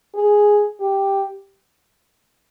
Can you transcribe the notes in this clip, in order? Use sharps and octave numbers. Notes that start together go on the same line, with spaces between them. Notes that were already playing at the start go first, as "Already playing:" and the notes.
G#4
G4